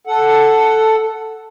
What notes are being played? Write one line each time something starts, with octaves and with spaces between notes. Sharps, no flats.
A4 F#5